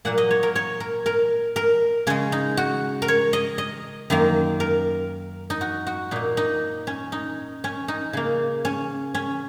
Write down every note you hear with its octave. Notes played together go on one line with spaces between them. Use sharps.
A#2 F#3 A#3 F#5
D#5
C#5
A#4
C#5
A#4
A#4
A#4
C#3 G#3 C#4
D#4
F#4
A#4
C#5
D#5
D#5
F#2 D#3 A#3
A#4
D#4
F#4
F#4
A#2 A#3 D#4
D#4
C#4
D#4
C#4
D#4
C#3 A#3
C#4
C#4